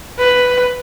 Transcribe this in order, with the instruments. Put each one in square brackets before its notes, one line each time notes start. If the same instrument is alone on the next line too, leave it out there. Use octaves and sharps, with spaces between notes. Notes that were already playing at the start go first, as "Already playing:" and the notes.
[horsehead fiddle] B4